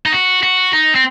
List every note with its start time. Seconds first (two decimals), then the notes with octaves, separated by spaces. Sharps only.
0.06 D#4
0.13 F#4
0.43 F#4
0.73 D#4
0.95 C4